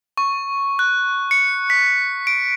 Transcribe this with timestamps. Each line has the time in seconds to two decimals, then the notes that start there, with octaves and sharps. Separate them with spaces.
0.17 C#6
0.79 F#6
1.31 C#7
1.70 B6
2.27 D7